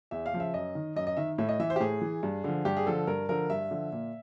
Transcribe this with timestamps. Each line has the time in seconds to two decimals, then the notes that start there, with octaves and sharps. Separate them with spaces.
0.11 E2 E5
0.26 F5
0.33 C#3 F3
0.40 E5
0.54 F#2 D#5
0.75 D#3
0.96 F#2 D#5
1.07 D#5
1.17 D#3 E5
1.38 A2 E5
1.49 D#5
1.60 E3 E5
1.70 C5
1.76 G4
1.80 A2 G#4
2.01 E3
2.23 G2
2.44 D3 F3
2.65 G2 G4
2.77 G#4
2.86 D3 F3 A4
3.07 G2 A#4
3.29 D3 F3 A#4
3.50 G2 E5
3.71 D3 F3
3.92 A#2